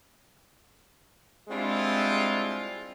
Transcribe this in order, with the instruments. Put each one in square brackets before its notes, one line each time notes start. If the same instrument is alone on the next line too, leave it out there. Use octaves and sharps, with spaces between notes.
[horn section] G3 G#3 C4 D4 E4 F4